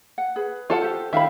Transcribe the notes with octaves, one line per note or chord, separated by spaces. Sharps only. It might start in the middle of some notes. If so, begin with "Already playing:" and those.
F#5
G#4 B4
F4 A4 F#5
G4 C5
D#3 E5 F5 B5